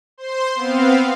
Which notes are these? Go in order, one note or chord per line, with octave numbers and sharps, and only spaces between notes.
C5 C6
B3 C4 F5